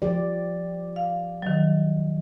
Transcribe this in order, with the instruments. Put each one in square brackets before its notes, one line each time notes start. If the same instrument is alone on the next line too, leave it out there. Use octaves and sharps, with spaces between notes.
[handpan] F3 G4 D5
[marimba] F5
D#3 F#3